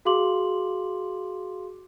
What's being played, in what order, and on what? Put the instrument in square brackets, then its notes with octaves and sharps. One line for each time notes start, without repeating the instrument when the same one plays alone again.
[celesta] F#4 G#4 F5 C6 D6 F#7